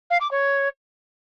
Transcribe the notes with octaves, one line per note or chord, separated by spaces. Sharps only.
F5
D6
C#5